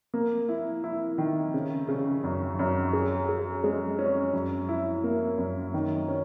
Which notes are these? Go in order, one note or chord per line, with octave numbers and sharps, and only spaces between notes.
A#3
E4
E4
D#3
C#3
C#3
F#2
F#2
G#4
G#4
G#3
C#4
F#2
E4
A#3
F#2
D#3
C#4